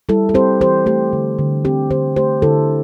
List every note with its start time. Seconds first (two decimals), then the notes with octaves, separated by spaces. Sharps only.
0.09 G3 E4 A4
0.29 A4
0.34 C4 G4 C5
0.61 E3 G4 C5
0.86 A3 G4
1.13 D3
1.39 D3
1.65 C4 G4
1.90 D3 G4 C5
2.16 A3 G4 C5
2.42 D3 E4 A4